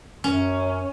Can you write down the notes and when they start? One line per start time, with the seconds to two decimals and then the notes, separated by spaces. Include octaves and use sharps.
0.24 F#2 C#4